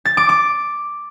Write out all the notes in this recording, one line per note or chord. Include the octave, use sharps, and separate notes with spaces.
A6
D6
D6